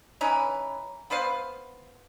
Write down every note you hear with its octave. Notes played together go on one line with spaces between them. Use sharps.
E3 C#4 D#4 B4
B3 B4 C5 F5